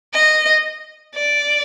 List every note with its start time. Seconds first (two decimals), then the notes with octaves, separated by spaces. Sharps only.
0.14 D#5
1.15 D5